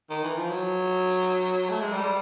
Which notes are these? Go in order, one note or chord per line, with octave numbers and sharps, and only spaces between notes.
D#3
E3
F3
F#3
A3
G#3
G3